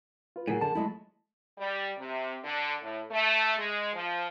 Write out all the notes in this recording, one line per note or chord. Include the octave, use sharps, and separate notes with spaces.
F4 B4
A2 F3 F#3 G#4 A#4 F#5 G#5
D3 A5
F3 F#3 G#3 A3 E4
G3
C3
D3
A2
A3
G#3
F3